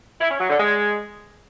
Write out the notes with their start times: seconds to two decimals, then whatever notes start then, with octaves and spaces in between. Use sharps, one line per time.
0.21 E4
0.30 C#4
0.40 F#3
0.50 D3
0.59 G#3